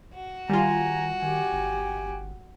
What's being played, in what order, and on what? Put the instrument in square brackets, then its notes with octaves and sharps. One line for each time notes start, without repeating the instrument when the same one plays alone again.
[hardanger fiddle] F#4
[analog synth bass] D#3 [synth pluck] G3 F4 [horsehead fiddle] G#5 A#5
[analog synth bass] D#3 [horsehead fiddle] G4 G#5
[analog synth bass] G1